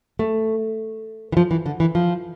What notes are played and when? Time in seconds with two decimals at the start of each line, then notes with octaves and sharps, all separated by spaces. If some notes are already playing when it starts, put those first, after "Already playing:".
0.19 A3
1.32 E3
1.37 F3
1.51 E3
1.66 D3
1.80 E3
1.95 F3